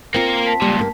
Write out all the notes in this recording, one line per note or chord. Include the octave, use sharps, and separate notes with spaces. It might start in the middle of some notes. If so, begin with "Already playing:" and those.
A#3 C4 F4 A#4 C#7
A5 B6
C#2 A#2 G3
G2 A#3